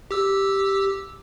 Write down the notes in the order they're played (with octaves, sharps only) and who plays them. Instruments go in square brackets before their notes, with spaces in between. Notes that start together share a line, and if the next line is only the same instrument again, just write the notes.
[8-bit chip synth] G4 E6